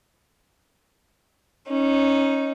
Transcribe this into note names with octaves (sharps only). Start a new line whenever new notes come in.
C#4 D#4